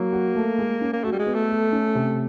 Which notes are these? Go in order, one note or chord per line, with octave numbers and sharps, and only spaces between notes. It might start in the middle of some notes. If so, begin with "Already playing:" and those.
Already playing: F#3 A#3
F#4
A3
G#3
C#4
A#3
A3 F#4
G3
G#3
B3
A3
A4
C#4
C3